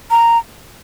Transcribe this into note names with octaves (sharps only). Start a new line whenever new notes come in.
A#5